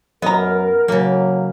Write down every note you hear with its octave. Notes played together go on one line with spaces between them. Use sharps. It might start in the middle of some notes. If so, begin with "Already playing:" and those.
F#2 B3 A#4 D#5 A#5
C#3 F#3 A#3